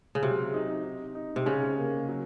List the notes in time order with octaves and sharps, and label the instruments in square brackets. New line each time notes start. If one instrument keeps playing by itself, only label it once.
[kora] C#3
[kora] C3 [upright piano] F#3
[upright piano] D#4
D#4
D#4
[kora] C3
[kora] C#3 [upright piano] C#4
[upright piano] A#3
F#3